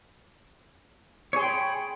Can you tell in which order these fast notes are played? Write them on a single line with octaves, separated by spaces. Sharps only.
C#5 G#4 C6 G5 B5